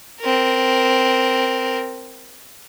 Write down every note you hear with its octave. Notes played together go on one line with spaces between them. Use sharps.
C4 A#4